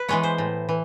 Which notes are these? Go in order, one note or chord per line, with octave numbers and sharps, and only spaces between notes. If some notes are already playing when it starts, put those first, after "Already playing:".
Already playing: B4
E3 G#3 B3 C#5
C5
A2
E3